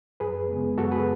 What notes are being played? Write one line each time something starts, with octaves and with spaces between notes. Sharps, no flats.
F#2 G#4 B4
C#3 G#3 B3
F#2 F#4 A4
G#4 B4